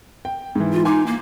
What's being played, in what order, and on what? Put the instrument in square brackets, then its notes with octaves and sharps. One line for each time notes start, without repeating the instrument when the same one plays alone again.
[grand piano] G5
G#2 E3
[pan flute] F4
[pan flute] D#4 [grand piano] G#5 C6 D6
[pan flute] A#3